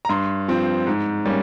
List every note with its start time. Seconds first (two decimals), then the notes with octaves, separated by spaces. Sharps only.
0.05 A#5
0.09 G2 C6
0.48 F3 C4
0.87 G#2
1.26 G3 A#3 C#4